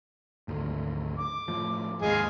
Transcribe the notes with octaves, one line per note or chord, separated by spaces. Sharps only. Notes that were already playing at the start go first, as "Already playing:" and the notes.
G#1 D2
D6
A2 F3
D#2 G#2 G#4 D#5 F5